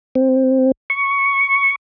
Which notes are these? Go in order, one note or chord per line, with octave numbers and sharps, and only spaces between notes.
C4
C#6